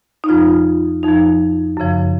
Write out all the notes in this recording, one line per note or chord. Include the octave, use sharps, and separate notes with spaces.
D#4
F2 F3 F4
F2 F3 D#4
F#2 C#3 F3